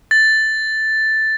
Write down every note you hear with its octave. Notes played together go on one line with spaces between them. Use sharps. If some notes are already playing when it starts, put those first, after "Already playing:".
A6